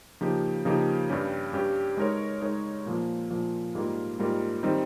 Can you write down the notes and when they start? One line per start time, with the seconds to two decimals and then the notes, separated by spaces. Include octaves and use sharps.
0.21 C#3 F3 A#3 D#4 G4
0.65 C#3 F3 A#3 D#4 G4
1.10 G2 G3 C#4 G4
1.53 G2 G3 C#4 G4
1.97 G#3 D#4 A#4 C#5
2.42 G#3 D#4 A#4 C#5
2.86 A#2 F3 A#3
3.30 A#2 F3 A#3
3.75 G#2 G3 A#3 F4 A#4
4.19 G#2 G3 A#3 F4 A#4
4.63 D#3 G3 C4 D#4